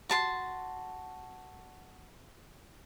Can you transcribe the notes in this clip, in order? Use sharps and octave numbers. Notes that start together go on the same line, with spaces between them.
F#4 A5 C6